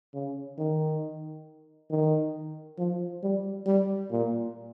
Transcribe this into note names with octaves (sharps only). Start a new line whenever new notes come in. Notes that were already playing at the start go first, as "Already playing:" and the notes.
C#3
D#3
D#3
F3
G3
G3
A#2